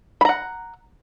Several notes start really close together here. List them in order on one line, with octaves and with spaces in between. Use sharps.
B5 A#5 F#5